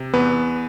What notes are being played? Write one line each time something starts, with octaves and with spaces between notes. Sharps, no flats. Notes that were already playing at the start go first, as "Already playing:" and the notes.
Already playing: C3
E2 B3 B4